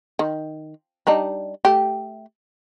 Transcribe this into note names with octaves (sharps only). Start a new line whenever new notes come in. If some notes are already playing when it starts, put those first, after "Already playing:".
D#3
G3 D4 D#4
A3 G4